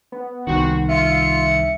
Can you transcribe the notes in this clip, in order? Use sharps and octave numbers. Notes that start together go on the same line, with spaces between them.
B3
C2 D#3 C4 F#4
F4 E5 C#7